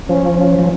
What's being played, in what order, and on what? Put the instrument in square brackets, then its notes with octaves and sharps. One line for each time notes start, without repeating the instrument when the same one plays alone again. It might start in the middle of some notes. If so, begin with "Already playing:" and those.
[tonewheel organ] F3 [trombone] C#4
[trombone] C#4
[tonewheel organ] F3